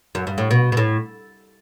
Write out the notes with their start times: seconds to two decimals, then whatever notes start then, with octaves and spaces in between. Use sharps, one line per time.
0.15 F#2
0.27 G2
0.38 A2
0.51 B2
0.72 B2
0.77 A2